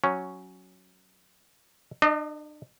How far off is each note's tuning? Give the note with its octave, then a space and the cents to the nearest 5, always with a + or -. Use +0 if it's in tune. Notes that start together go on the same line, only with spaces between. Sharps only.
F#3 +0 C#4 +0
D4 +40 D#5 +0